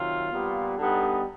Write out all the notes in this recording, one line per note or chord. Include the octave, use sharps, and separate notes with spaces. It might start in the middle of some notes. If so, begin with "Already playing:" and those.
Already playing: C3 D#3 F#3 F4
A#2 G3 B3
D3 G3 B3 D#4